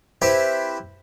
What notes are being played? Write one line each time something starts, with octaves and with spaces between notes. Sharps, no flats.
C4 E4 G4 B4